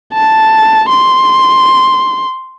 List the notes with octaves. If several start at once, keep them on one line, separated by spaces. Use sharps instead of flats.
A5
C6